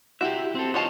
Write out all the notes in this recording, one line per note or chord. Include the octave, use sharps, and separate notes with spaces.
E4 F#4 G4 E5
C4 A4
D#3 F4 C5 C#5 D#5 A5